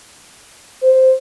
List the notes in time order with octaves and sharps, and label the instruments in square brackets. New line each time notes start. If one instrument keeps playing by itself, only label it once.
[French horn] C5